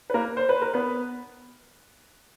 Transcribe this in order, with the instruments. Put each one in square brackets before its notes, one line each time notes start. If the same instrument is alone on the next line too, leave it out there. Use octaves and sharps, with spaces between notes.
[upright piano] B4
A#3 A#4
C5
B4
A#4
B3 B4